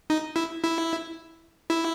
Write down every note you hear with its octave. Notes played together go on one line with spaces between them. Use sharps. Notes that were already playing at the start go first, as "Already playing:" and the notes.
D#4
E4
E4
E4